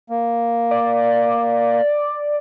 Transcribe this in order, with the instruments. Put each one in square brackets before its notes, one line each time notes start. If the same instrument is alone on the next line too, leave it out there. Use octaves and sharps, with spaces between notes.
[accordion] A#3
[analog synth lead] D5